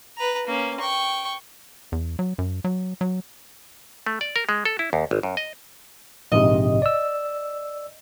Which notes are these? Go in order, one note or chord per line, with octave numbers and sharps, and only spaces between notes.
B4 A#5
A#3 C#4
G5 C#6
E2
F#3
F#2
F#3
F#3
A3
D5
A#4
G#3
A4
E4
D#2
G#1
F#2
D#5
A#1 G#2 C3 D#5
D5 E6